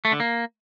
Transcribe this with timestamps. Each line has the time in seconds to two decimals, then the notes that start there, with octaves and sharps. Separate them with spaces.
0.05 A3
0.12 D3
0.20 A#3